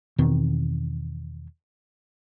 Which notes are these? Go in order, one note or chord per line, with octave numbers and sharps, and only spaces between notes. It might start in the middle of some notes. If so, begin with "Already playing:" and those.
E2 B2 D#3 C4